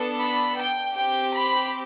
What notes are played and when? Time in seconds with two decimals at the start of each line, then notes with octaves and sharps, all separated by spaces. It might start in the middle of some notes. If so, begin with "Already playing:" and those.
Already playing: B3 D4 A4
0.19 B5
0.57 G5
0.94 C4 G4 G5
1.33 B5